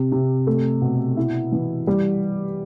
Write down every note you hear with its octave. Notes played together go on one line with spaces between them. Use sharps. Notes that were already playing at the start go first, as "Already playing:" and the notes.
Already playing: C3
C3
A3
B2
E4
E3
G3